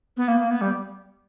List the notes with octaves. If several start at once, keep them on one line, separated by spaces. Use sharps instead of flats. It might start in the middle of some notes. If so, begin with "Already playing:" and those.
B3
A#3
A#3
B3
G3